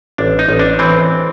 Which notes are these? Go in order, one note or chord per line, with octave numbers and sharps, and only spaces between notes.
A1 D4
D#4
A1
D4
E3 C4